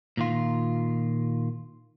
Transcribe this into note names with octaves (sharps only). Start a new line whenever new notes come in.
A#2 D#3 F4